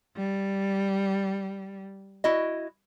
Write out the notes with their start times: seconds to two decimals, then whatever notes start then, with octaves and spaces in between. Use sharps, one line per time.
0.16 G3
2.24 E4 F#4 D#5